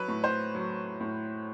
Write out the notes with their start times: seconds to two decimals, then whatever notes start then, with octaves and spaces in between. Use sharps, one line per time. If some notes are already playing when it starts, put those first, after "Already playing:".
Already playing: F#3 B4
0.08 A2
0.24 C5
0.55 F#3
1.00 A2